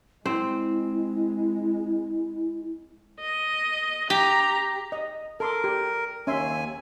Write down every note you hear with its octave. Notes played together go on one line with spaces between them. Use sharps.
G#3 C4 E4
D#5
G4 A#5
D#5
A4 A#4 C6 D6
G4
D#2 C#4 E5 G#5 C6